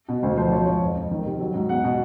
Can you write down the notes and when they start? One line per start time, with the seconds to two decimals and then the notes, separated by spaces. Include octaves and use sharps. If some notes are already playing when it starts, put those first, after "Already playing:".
0.08 B2
0.23 D2 C5
0.37 F3 C5
0.51 F3 C#5
0.67 G#2 C#5
0.81 F2
0.96 F2
1.11 D#3
1.26 C3
1.40 F#3
1.54 G#2
1.69 E2 F#5
1.84 B2